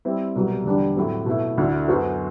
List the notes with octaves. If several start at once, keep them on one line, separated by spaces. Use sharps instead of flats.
G3 C4 E4
C2 B2 F#3
E2 D3 G3 D4
A2 F#3 C4
B2 A3 E4
D2 D3 A3 E4
F#2 F#3 B3 F#4 C5